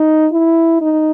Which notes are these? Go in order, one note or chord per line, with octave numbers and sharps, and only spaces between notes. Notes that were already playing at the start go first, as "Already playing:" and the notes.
Already playing: D#4
E4
D#4